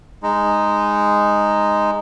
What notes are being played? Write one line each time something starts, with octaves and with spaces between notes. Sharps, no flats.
G#3 D#4